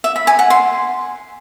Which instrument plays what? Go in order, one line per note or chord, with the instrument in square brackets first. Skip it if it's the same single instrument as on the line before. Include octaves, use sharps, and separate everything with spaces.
[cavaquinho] E5
B5
G#5
F#5
C6